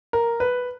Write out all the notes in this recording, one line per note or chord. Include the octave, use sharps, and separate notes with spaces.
A#4
B4